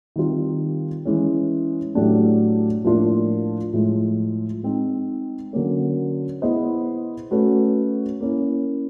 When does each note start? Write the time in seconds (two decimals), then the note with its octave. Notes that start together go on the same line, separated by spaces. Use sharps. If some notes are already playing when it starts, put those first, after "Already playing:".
0.16 D#3 G3 C4 F4
1.05 E3 G#3 C#4
1.95 A2 F#3 A3 D4 G4
2.84 A2 F3 A#3 D4 F4
3.73 A2 F3 G#3
4.63 G#3 C4 D#4
5.53 D3 F#3 A#3 C#4
6.42 B3 E4 G#4 C5 D#5
7.31 A3 C#4 F#4 B4
8.21 A#3 C#4 E4